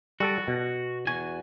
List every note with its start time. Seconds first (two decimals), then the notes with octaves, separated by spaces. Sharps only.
0.20 G3 F#4 A4 A5
0.48 B2
1.07 E2 F#4 G#5